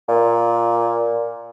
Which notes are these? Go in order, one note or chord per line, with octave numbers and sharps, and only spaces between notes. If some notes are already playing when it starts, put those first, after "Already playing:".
A#2